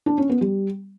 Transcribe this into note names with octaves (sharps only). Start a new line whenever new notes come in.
D4
C#4
B3
G3